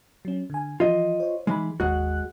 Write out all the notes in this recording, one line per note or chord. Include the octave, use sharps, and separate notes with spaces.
F#3 C#4
D3 G#5
E3 F3 F4 D#5
C5 C#5
E3 G#3 D#4 B5
G1 D#2 G#3 F#4 F#6